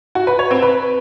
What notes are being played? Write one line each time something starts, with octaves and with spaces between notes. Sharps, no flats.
F#4
B4
C#5
C4
B4